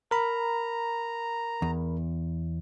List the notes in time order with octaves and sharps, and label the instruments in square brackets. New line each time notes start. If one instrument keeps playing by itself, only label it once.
[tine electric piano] A#4 B5 [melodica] A#5
[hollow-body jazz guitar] E2